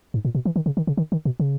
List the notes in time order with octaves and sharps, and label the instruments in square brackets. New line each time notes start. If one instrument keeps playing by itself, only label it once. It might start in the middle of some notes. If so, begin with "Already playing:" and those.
[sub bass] G#2
A#2
B2
E3
D#3
C#3
D#3
C#3
D#3
D#3
B2
C#3